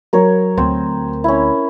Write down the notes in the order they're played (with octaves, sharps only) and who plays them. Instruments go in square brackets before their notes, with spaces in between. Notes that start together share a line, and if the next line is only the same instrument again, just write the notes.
[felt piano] F#3 [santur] A#4 C#5
[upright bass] D2 [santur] C4
[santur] C#4 E4